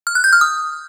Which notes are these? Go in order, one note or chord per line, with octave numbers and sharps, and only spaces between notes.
F6
F#6
G6
F6
D#6